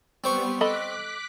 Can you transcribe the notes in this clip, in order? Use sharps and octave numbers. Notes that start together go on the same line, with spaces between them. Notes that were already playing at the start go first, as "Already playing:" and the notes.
G3 B3 C4 C5 C#6
A4 D#5 B5 D6 F#6 B6